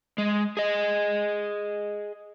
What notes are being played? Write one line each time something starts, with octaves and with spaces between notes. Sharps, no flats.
G#3
G#4 D#5